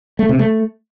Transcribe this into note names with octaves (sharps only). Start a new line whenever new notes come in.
A3
C3
A3